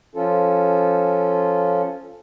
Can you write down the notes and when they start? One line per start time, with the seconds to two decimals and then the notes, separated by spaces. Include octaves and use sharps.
0.15 F3 C#4 F4 A4